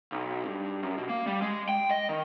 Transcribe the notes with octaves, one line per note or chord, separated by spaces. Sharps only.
B1
G2
F#2
B2
A#3
G3
G#3
G5
D#5
D#3